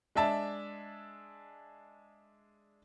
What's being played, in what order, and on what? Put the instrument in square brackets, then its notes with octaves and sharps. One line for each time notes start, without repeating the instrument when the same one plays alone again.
[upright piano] G#3 D4 E5 A5